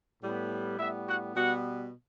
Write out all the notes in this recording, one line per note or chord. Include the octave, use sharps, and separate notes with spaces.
A2 G3 B3
A2 G3 B3 E4 E5
F#4 F#5
B2 G3 B3 F#4 F#5